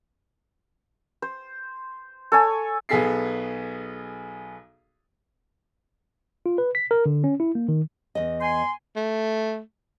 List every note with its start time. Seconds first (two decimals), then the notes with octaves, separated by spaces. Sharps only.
1.22 C5
2.32 A4 C#5 G#5
2.89 B1 B3 G#4 A4 B6 C7
6.46 F4
6.58 B4
6.75 B6
6.91 A#4
7.06 D3
7.24 C#4
7.40 E4
7.55 A#3
7.69 D#3
8.15 E2 D#5
8.40 G#5 C6
8.96 A3